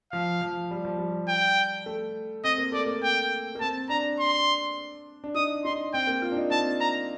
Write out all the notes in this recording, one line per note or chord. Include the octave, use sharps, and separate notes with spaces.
F3 F5
F3
G3
F3
G3
G5
A3
C4 D#5
A#3
A3 D5
A#3
G5
A#3
C4 A5
D4 A#5
C6
D4
D#4 D#6
D#4 C6
C4 G5
A#3
F4
D4
D#4
C4 A5
A#5